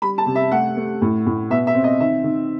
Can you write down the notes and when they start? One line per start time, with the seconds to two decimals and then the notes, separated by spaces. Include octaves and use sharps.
0.02 G3 B5
0.18 A5
0.26 C3
0.35 E5
0.52 A3 F#5
0.77 A3
1.02 A2
1.26 A2
1.50 B2 E5
1.67 E5
1.75 C4
1.84 D#5
2.00 D#3 E5
2.24 D#3